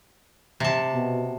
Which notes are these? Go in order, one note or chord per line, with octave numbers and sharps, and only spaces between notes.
C3 A5
B2